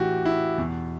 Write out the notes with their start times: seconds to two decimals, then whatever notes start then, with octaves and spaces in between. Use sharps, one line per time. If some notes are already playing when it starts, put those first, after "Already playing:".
Already playing: A2 E3 F#4 G4
0.25 E4
0.58 E2 B2